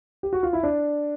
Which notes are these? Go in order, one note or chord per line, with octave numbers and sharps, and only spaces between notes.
G4
F#4
F4
E4
D4